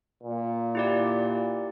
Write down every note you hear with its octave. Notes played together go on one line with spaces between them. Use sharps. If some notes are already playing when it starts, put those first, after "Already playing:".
A#2
E4 G4 D5